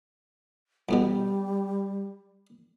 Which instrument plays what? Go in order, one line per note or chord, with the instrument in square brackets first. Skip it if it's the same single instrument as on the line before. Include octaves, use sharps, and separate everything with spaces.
[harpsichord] B1 E2 B2 [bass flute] G3